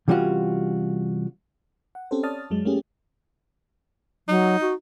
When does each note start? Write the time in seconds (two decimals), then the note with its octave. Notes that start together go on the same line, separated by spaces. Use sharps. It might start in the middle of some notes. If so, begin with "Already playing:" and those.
0.08 C3 E3 G3 C#4 F4 F#4
1.95 F#5
2.11 C4 C#4 G4 A4 C5
2.23 C#5 D5 A5 D#6 F6 A6
2.50 F#2 F#3 G#3
2.65 A3 A#3 C#4 G4 G#4
4.28 F#3 D#4
4.61 F#4